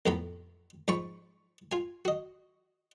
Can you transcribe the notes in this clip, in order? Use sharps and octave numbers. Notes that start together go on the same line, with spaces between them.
F2 A2 C3 B3 A#5 B5
G#2 F3 B5 C#6
F4 G#5
F#4 D#5